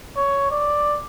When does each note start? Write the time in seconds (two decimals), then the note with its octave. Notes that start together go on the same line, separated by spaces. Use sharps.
0.17 C#5
0.51 D5